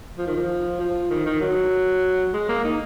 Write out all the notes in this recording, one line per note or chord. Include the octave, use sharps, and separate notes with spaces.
F3
D#3
F3
F3
D#3
D#3
F#3
G#3
A#3
D#4